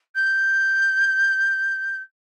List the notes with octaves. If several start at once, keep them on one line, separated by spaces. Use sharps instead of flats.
G6